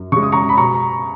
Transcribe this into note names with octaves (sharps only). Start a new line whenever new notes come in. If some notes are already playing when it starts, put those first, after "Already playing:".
Already playing: F#2
C#3 G#3 C#6
D#6
A#5 C#6
B5
B2 A#5 C#6